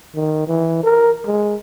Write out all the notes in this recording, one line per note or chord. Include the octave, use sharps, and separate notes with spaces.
D#3
E3
A#4
G#3